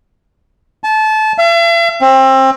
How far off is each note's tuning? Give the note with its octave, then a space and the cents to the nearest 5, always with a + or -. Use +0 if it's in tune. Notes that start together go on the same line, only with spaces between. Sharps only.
A5 -25
E5 +45
C4 +25